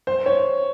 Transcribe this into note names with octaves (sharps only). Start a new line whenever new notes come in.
C5
C#5